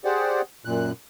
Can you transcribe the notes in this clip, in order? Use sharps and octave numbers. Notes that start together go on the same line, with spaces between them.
G4 G#4 C5 D5 F#5
F#2 A#2 F#6